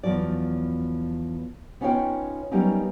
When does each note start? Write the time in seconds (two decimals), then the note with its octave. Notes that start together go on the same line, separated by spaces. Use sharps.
0.03 E2 F3 F#3 D5
1.81 B3 C#4 D#4 F4 C#5 G5
2.51 F#3 G3 A#3 B3 C#4 D#4